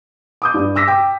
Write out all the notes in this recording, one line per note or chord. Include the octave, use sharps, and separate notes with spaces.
D6 D#6 G6
G2
D6 E6 A#6 B6
G5 D6